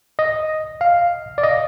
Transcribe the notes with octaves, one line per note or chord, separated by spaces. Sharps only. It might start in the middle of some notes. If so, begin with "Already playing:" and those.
D#5
F5
D5
D#5